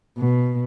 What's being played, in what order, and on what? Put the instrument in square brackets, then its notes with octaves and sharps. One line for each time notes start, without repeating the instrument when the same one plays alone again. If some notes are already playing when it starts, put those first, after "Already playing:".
[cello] B2